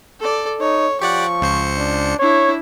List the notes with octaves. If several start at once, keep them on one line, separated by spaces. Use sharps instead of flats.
A4 D5
D#4 C#5
F3 G4 D5 F#5 C#6
C#2 C5 C#7
D4
D4 E4 C#5